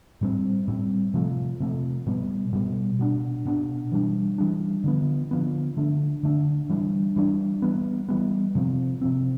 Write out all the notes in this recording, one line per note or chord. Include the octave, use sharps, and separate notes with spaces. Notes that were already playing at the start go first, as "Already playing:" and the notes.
A2 G3 C4
A2 G3 C4
C3 F3 A3
C3 F3 A3
B2 G3 B3
B2 G3 B3
B2 B3 D4
B2 B3 D4
E3 G3 D4
E3 G3 D4
D3 F3 B3
D3 F3 B3
D3 A3 D4
D3 A3 D4
E3 G3 D4
E3 G3 D4
E3 G3 B3
E3 G3 B3
C3 F3 C4
C3 F3 C4